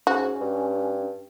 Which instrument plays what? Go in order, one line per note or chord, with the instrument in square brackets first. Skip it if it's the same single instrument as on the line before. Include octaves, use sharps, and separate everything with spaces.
[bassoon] G#2 [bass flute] C#4 [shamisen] F#4
[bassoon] G2